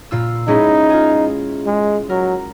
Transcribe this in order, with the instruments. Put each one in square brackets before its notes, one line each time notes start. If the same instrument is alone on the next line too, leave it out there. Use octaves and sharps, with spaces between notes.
[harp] A#2 F4 E6
[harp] G#3 C#4 E4 [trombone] D#4
[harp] F4 G#4
[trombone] G#3
[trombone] F#3 [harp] A#4